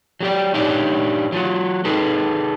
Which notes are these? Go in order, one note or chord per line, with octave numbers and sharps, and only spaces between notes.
F#3 G4 D5
D4 D#4 G4 C#5 D5
F#3 F4 F#4
D#4 G#4 A4 B4